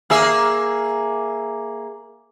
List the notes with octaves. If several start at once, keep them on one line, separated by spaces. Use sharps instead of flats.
A#3 G#4 E5